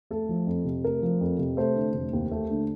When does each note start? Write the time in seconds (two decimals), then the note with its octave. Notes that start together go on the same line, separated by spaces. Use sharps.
0.11 A3 A4
0.29 F3
0.47 F2
0.65 C3
0.84 A3 A#4
1.02 F3
1.21 F2
1.39 C3
1.57 A3 C5
1.75 D3
1.94 F1
2.13 D#2
2.31 A3
2.50 D3